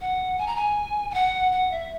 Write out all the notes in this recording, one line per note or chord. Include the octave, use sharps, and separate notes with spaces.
F#5
G#5
A#5
G#5
G#5
F#5
F#5
E5